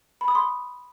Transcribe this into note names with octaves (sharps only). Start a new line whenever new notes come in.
B5
D#6
C6